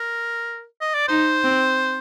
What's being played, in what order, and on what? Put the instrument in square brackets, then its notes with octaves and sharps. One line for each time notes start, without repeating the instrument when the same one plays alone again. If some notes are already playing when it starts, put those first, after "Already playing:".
Already playing: [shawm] A#4
D#5
D5
[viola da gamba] D#4 [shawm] C5
[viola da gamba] C4